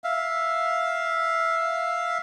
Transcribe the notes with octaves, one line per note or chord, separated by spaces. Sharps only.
E5 F5